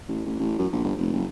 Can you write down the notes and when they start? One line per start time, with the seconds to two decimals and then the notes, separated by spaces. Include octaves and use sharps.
0.09 A1
0.26 A1
0.39 A1
0.58 F#2
0.72 A#1
0.84 G1
0.98 F1
1.13 F#1